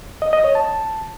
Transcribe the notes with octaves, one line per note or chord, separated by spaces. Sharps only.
D#5
D#5
C#5
A5